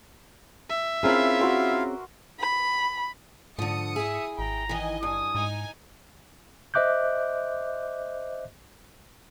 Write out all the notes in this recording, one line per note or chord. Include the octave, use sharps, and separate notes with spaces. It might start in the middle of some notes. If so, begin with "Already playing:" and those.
E5
C4 C#4 E4 F4 G#4 A#4 F5 B5
F#4 C6 D6
B5
G#2 D3 F3 D#6 C#7
E4 G#4 E5
G#1 G5 A#5
D#3 E3 D#5 G#5
G2 G#5 D#6
G#2 D#4 G#5
C5 D#5 E5 D6 F#6 G6